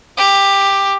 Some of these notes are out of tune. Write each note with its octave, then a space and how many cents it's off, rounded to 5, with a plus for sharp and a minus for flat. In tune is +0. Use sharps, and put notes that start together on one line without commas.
G4 +10